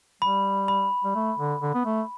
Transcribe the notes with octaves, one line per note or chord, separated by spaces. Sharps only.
G3 B5
B5
G3
A3
D3
D3
B3
A3